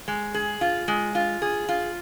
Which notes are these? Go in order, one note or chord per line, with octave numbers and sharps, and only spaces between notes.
G#3
G#4
F4
G#3
F4
G#4
F4